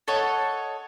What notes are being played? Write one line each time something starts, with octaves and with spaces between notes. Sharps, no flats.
A4 C#5 D#5 F#5